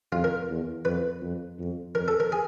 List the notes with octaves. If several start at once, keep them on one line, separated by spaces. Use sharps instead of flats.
F2 F4
A#4
E2
F2 B4
F2
F2
F2 A#4
A4
A#4
G#4